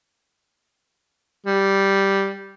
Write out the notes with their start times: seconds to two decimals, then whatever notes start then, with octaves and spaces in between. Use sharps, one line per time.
1.46 G3